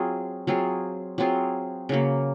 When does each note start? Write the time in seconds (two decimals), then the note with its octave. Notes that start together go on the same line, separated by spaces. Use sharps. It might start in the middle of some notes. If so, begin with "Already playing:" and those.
Already playing: F#3 C4 F4 G#4
0.47 F#3 C4 F4 G#4
1.18 F#3 C4 F4 G#4
1.89 C#3 F#3 A#3